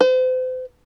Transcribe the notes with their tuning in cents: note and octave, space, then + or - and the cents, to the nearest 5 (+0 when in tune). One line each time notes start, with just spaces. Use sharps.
C5 -40